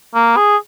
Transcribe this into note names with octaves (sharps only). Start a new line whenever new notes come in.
A#3
G#4